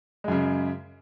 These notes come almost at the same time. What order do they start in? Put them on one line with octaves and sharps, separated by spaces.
G#3 F#2 C#3